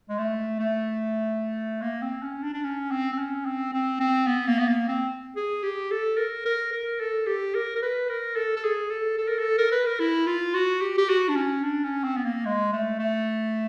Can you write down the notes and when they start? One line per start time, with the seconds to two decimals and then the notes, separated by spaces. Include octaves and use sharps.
0.09 G#3
0.18 A3
0.59 A3
1.82 A#3
2.02 C4
2.23 C#4
2.43 D4
2.54 D4
2.64 C#4
2.91 C4
3.13 C4
3.18 C#4
3.46 C4
3.73 C4
4.00 C4
4.27 B3
4.47 A#3
4.59 B3
4.68 A#3
4.88 C4
5.36 G#4
5.63 G4
5.91 A4
6.18 A#4
6.45 A#4
6.72 A#4
7.00 A4
7.26 G4
7.55 A#4
7.76 A#4
7.82 B4
8.09 A#4
8.36 A4
8.56 A4
8.64 G#4
8.90 A4
9.18 A4
9.28 A#4
9.39 A4
9.58 A#4
9.72 B4
9.86 A#4
10.00 E4
10.27 F4
10.54 F#4
10.81 G4
10.98 G4
11.09 F#4
11.28 D4
11.36 C#4
11.63 D4
11.84 C#4
12.04 C4
12.17 B3
12.25 A#3
12.45 G#3
12.73 A3
12.99 A3